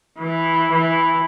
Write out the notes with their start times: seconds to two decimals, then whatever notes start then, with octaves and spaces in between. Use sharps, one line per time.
0.19 E3
0.72 E3